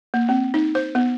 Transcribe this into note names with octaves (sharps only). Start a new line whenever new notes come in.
A#3
C4
D#4
C5
B3